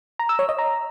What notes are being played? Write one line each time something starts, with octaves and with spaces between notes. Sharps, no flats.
A#5
E6
C#5
D#5
A#5